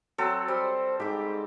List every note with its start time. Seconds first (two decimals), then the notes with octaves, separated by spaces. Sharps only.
0.18 F#3 C4 A4
0.48 G3 C5
1.00 G#2 G4 D6